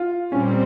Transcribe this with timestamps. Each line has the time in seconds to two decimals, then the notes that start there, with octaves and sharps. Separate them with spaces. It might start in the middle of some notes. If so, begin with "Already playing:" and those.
Already playing: F4
0.32 A#2 G3 C4 C#4